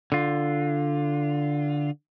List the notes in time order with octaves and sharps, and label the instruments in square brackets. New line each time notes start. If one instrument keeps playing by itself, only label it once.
[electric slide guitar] D3 F4